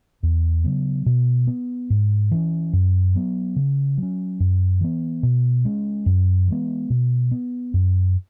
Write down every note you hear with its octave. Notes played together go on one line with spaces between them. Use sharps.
E2
C#3 F#3 B3
B2
B3
G#2
E3 C#4
F#2
F#3 B3
C#3
F#3 C#4
F#2
E3 B3
B2
G#3 C#4
F#2
E3 G#3 B3
B2
B3
F#2